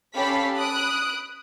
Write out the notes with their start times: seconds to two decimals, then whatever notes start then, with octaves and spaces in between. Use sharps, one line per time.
0.15 C#4 G4 A4 F5 B5 B6
0.55 B5 D#6 F#6 D7